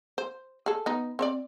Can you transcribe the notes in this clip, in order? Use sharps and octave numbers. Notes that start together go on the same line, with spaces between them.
C5
G#4 A4
B3 D#4
C4 C#5 D5